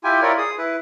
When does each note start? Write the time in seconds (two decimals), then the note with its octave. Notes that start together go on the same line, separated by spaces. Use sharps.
0.04 E4 F4 G4 G5 G#5
0.22 E4 F4 A#4 C#5 D5
0.38 G#4 D#6
0.58 E4 B4